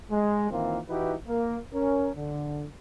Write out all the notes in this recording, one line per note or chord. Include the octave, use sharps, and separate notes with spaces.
G#3
D#3 E3 A#3 C4 F4
E3 D#4 E4 F#4 G4 B4
A#3 A#4
C#4 A#4
D3